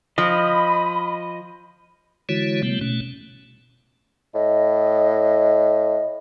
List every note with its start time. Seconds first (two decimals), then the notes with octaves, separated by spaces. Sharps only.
0.18 F3 D#5 B5
2.29 D3 E3 G#3 E4 F#4 C#5
2.63 C3 G3 A3 B3
2.81 B2 A3 C#4
4.34 A2 D#5